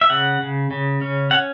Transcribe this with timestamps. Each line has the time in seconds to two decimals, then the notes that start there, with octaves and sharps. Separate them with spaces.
0.01 E5
0.10 C#3 F#5
0.41 C#3
0.71 C#3
1.01 C#4
1.31 C#4 F#5